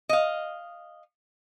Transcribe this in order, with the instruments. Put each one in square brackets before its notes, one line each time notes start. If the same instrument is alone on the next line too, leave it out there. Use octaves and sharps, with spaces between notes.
[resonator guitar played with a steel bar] D#5 F5